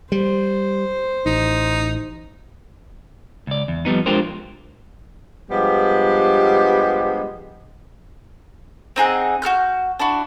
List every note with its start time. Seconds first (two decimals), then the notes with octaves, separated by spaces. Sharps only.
0.12 G3 C5
1.26 A1 D#4
3.47 C#2 D5
3.68 E2
3.85 F3 G3 B3 D#4
4.06 G#3 D4 F4 G4 A#4 C5
5.51 G2 F3 G3 G#3 B3 G4
8.96 C4 D#4 G#4 F#5
9.42 F#4 A4 F6 G6
10.00 D4 E4 F#4